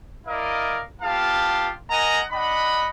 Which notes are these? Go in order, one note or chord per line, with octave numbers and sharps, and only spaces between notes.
E4 A#4 D5 D#5 F5
B3 F4 G4 F5 A5
A#4 D#5 F#5 G#5 A#5
D4 D#5 F#5 B5